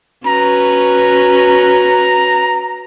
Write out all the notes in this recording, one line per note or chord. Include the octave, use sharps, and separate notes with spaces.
C#4 F#4 B4 A#5